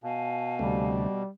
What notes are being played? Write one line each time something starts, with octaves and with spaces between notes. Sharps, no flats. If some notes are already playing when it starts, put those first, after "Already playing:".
B2 F5 G#5 A5
D2 C3 G3 A3